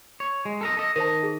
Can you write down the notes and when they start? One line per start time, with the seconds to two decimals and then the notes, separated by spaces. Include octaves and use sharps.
0.20 C#5
0.45 G#3
0.61 A4 A#4 D#5
0.77 A4 D#5
0.96 D#3 A#4 C5 D#5 A5
1.23 G#4